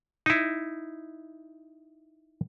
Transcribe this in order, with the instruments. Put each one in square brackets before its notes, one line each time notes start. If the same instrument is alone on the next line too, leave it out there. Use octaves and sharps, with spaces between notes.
[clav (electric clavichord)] D#4 E4